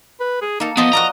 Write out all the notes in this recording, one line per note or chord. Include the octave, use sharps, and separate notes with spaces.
B4
G#4
A#3 D#4 A4
F3 B3 D#5 A5
F#4 A#4 D5 A#5